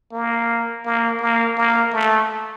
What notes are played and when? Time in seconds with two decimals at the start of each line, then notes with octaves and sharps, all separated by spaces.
0.12 A#3
0.86 A#3
1.21 A#3
1.57 A#3
1.93 A3